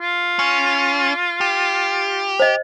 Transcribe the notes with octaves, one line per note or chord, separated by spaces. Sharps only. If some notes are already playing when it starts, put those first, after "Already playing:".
F4
C#4
G4
C5 D#5